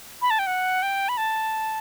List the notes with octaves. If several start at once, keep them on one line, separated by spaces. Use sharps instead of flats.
B5
A5
G5
F#5
G5
B5
A5